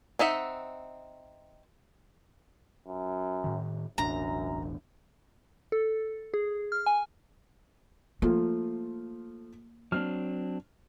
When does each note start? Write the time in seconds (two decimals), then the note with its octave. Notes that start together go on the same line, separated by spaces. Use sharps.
0.19 C4 D#4 E5 F#5
2.87 F#2
3.44 A2 D#3
3.98 E1 A1 F#2 D4 A#5
5.72 A4
6.34 G#4
6.72 F6
6.86 G#5
8.22 F3 A3 A#3 F4
9.92 F#3 C4 D4 F6